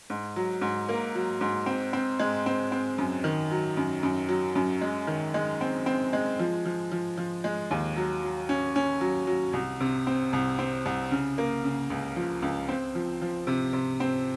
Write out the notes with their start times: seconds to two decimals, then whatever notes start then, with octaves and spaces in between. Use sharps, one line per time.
0.10 G#2
0.36 F#3
0.61 G#2
0.89 A#3
1.15 F#3
1.41 G#2
1.66 C4
1.93 C4
2.19 G#3
2.46 C4
2.72 C4
2.98 F#2
3.24 D#3
3.51 F#3
3.77 F#2
4.03 F#2
4.29 F#3
4.55 F#2
4.81 G#3
5.07 D#3
5.34 G#3
5.61 C4
5.86 C4
6.13 G#3
6.39 F3
6.65 F3
6.92 F3
7.18 F3
7.44 G#3
7.71 D#2
7.96 F#3
8.23 F#3
8.49 C#4
8.76 C#4
9.01 F#3
9.27 F#3
9.53 C2
9.80 C3
10.07 C4
10.33 C2
10.59 C4
10.86 C2
11.11 C#3
11.38 A#3
11.64 C#3
11.90 C#2
12.16 F3
12.42 C#2
12.68 C4
12.95 F3
13.22 F3
13.47 C3
13.73 C3
14.00 C4